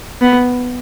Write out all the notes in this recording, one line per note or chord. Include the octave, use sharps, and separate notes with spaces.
B3